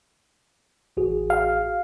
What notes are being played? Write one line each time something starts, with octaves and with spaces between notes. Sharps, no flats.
A1 F#4 G#4
F5